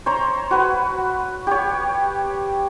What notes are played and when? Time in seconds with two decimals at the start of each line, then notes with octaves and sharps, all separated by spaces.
0.06 C5 C#5 A#5
0.51 F#4 B4
1.47 G4 C#5